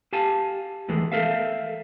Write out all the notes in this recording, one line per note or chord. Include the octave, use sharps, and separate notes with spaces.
G4 F5 G#5 A5
D#2 E3 G#3 A3
A4 A#4 E5 F5